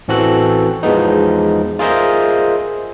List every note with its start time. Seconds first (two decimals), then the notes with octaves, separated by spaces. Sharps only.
0.08 A1 E3 C4 F#4 A4 F#6
0.83 E2 F3 G#3 B3 D#4
1.79 F4 G#4 A#4 C5 D#5 E5